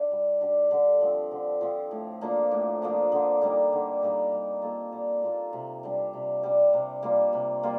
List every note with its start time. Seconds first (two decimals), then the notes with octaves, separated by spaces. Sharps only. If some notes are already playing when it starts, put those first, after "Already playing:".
Already playing: D4 G4
0.11 G3
0.41 D4 G4
0.71 D3
1.01 F3 C4
1.31 D3
1.61 F3 C4
1.91 A2
2.21 F3 A#3 D4
2.51 A2
2.82 F3 A#3 D4
3.12 D3
3.41 G3 A#3 D#4
3.73 D3
4.02 G3 A#3 D#4
4.32 G3
4.62 A#3 F4 A4
4.92 G3
5.23 A#3 F4 A4
5.53 C3
5.83 G3 D4
6.13 C3
6.43 G3 D4
6.73 C3
7.03 G3 A#3 F4
7.33 C3
7.63 G3 A#3 F4